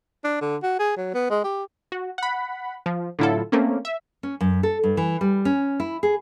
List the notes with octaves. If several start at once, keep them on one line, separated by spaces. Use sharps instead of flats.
D4
D3
F#4
G#4
F#3
B3
G#3
G4
F#4
F#5 B5
F3
A2 D3 F#3 E4 F4 A4
A3 A#3 C4 C#4
E5
C#4
F#2
A4
G2
E3
G3
C#4
E4
G#4